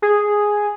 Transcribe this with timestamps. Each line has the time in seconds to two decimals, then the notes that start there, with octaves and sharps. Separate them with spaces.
0.02 G#4